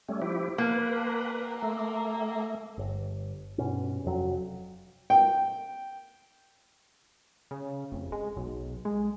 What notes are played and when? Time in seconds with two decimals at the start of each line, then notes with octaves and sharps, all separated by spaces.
0.09 G3 A3 C#4
0.22 F3 E4 G4
0.58 A#3 B4
1.62 A3
2.78 G1
3.58 G2 B2 C#4
4.05 F1 F2 F#3
5.10 G5
7.51 C#3
7.92 F1
8.12 G#3
8.36 B1
8.85 G#3